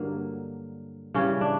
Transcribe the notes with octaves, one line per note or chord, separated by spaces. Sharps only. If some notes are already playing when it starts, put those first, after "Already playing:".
Already playing: G2 D3 F#3 A#3
C#3 E3 G3 C#4
D4